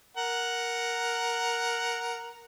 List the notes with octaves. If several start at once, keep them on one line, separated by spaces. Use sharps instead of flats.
A#4 F#5